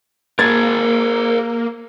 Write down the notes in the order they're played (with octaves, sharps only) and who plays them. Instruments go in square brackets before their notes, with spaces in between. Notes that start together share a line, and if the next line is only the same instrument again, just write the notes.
[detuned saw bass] A#3 [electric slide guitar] G#4 A#4 [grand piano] G#6 A6